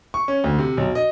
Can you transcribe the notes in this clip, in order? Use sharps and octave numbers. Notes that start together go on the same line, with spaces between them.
C#6
C#4
D2
C3
B1
D#5